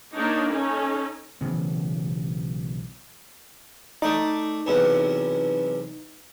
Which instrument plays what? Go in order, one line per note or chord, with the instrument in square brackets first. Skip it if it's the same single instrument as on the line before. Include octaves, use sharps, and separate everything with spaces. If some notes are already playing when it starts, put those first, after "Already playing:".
[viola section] A#3 D4 D#4 C#5
C#4 D#4 A4
[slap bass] B1 C#3 E3 B3
[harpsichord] A3 D5 [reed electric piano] D#4
[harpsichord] B1 E2 C3